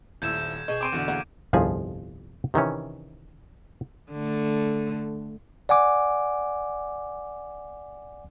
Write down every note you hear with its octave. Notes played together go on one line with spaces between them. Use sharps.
D#1 A3 E4 C5 E6 G6 G#6 E7
B2 G#4 D#5 G#5 C#6
C4 C6 D6 D7 D#7
E2 B2 D3 E4 D5
C#3 E3 A#3 F#5
G1 C2 F2 F3 G#4 G#5
C3 D#3 E3 C#4
D3 A3
D5 F#5 G#5 D6